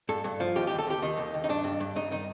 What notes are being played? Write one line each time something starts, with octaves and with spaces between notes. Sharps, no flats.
G2 A4
G2
F3
D#2 G4
G4
D#2
A4
D#2 G4
D#3 D#4
D#2
D#2
D#4
G2 D4
G2
G2
G2 D#4
D#3 D#4